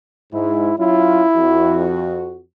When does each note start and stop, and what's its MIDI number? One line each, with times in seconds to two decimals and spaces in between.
0.33 0.72 44
0.33 0.76 64
0.79 1.25 54
0.79 1.25 61
0.79 1.93 64
0.79 1.25 65
1.36 2.41 41
1.36 2.41 66